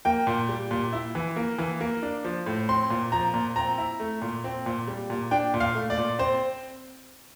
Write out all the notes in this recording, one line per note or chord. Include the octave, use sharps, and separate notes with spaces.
A#3 G5
A#2
G3
A#2
E4
E3
A#3
E3
A#3
D4
F3
A2
C4 C6
A#2
F3 A#5
A#2
C4 A#5
E4
A3
A#2
C4
A#2
G3
A#2
D4 G5
A#2
F5
A3
D5
A#2
C4 C5